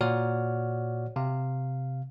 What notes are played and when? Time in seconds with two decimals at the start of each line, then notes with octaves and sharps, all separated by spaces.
0.01 A#2 F#4 C#5 D5 F#5 F6
1.16 C3 F5